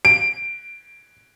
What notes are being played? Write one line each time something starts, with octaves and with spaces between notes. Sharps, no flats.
D7